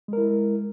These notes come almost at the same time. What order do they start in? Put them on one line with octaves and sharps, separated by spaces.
G#3 A#4 E4